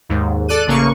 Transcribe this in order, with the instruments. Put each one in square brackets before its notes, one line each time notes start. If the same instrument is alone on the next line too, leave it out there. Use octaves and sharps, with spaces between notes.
[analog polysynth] D#2 G#2
A4 D5 F#6 D#7
A1 C#3 A#3 C#6